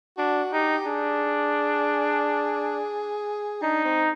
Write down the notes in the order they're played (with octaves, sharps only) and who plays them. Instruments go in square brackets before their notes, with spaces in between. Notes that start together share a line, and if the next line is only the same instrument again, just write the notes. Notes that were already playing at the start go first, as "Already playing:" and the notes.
[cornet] D4 [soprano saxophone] F#4
[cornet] D#4 [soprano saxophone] G4
[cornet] D4 [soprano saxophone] G#4
[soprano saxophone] D4 [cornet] D#4
[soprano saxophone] C4